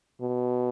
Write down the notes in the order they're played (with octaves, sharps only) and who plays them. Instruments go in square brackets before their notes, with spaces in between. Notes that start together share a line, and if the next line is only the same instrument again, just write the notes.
[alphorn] B2